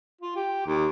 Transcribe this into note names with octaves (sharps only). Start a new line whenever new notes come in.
F4
G4
D#2